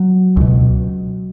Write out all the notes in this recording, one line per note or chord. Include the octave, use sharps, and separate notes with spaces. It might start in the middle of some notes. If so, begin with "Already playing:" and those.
Already playing: F#3
C#2 B2